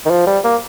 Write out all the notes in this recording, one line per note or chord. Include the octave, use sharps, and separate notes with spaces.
D#3
F3
G3
A#3